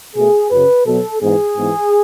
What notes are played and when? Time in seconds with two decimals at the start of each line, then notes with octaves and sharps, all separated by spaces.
0.16 B2 A3 G#4
0.51 F#2 C#3 F#3 B4
0.87 B2 F#3 B3 A4
1.22 G#2 E3 B3 G#4
1.58 G#2 E3 B3